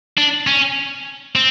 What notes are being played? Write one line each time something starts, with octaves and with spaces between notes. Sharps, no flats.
D4
C#4
C4